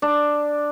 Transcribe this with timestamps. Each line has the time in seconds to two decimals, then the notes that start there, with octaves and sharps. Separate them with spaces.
0.02 D4